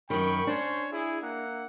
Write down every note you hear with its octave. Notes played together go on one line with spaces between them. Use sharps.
F#2 D#3 G5 B5 C#6
C#4 D4 C5 C#5
E4 G#4
A#3 E5 F#5